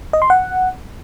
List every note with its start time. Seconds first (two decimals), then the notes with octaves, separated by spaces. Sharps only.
0.13 D#5
0.22 C6
0.30 F#5